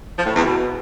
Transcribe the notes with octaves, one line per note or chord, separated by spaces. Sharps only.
F3
A2
E2
B2